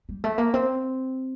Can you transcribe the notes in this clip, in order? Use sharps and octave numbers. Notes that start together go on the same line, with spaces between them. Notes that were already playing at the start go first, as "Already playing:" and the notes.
G3
A3
A#3
C4